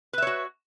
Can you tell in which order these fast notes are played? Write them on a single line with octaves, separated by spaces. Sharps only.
B4 E5 C#5 F#4